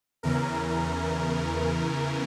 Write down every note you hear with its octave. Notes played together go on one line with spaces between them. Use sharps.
E2 C#3 E3 A#4